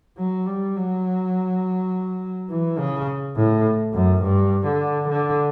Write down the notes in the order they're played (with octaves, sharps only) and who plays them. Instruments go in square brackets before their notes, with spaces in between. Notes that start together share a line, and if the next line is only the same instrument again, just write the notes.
[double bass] F#3
G3
F#3
E3
C#3
A2
F#2
G2
D3
D3